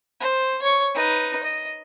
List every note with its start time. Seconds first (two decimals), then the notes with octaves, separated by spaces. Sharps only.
0.21 C5
0.62 C#5 C#6
0.95 D#4 B4
1.43 D#5